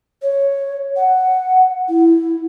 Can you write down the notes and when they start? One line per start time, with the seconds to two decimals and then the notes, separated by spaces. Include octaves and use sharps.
0.22 C#5
0.96 F#5
1.88 E4